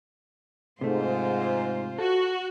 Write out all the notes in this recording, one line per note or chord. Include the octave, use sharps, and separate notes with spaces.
G#2 C3 A3 F4 C5
F#4 A4